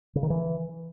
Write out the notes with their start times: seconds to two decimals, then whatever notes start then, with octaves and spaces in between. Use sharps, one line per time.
0.15 C#3
0.23 D#3
0.30 E3